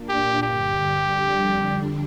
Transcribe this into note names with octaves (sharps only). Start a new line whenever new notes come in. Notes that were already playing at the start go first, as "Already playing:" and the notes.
Already playing: A#2 A#3 D4
G4
G2 D3 G3 G4
F2 D3 G3 D4